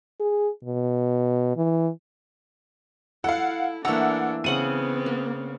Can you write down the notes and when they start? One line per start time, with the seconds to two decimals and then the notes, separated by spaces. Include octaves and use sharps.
0.20 G#4
0.64 B2
1.56 E3
3.24 E4 A4 F5 F#5
3.85 E3 A3 A#3 D4 F#5 A#5 E6
4.44 C#3 B3 C4 F#5 C#6 D#7 F#7
5.06 A#3